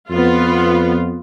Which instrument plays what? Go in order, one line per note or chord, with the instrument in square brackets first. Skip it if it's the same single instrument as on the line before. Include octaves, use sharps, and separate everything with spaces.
[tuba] F2 [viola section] B3 F4